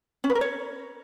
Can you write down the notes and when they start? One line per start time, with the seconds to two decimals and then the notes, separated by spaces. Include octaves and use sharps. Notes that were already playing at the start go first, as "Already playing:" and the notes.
0.24 C#4
0.30 B4
0.35 A#4
0.41 C#5